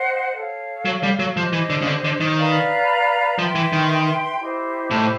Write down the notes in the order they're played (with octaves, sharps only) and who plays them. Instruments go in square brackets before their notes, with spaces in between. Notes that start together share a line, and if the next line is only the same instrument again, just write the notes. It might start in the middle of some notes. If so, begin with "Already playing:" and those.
Already playing: [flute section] C5 D#5 F#5
A4 C#5 F5
[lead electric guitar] F#3
G3
F#3
[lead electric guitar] F3 [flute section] G4 C5 D#5
[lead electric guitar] E3
D3
C#3
D3
D3
D#3
[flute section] B4 D5 F5 A#5
[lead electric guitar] F3 [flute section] B4 E5 G5 C6
[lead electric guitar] E3
D#3
[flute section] E4 G4 C5 D#5
[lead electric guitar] A2